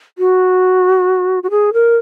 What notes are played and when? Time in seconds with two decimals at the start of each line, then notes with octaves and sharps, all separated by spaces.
0.18 F#4
1.43 F#4
1.50 G#4
1.73 A#4